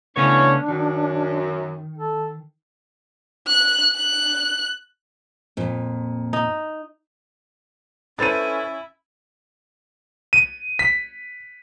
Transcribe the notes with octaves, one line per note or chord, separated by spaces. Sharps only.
C#3 E3 A3 B3 C#4 D4 C#5
F#2 D#3
A4
F#6
F#6
F2 A#2
D#4
C#4 E4 A4 B4 C5 A6 D#7
D#7
B6